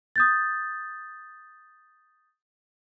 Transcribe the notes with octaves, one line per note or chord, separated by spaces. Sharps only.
D#6 G6 A6